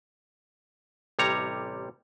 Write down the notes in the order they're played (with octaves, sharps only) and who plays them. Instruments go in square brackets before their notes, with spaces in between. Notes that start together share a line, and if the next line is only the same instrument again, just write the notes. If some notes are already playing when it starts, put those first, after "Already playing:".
[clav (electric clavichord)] A1 C3 G3 C#5 A#5